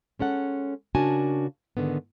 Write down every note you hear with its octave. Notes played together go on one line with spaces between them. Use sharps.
G#3 C#4 A4 F#5
C#3 D4 F#4 A#4 G#5 A5
G#2 D3 D#3 B3